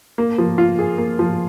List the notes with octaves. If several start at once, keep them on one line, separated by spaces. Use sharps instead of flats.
A#3
F3
F4
G#4
A#3
F3